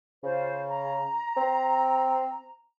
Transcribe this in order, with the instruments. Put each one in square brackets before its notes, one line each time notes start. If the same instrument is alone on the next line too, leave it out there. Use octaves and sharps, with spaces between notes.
[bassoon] C#3 [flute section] F4 C5
[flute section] A#5
[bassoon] C4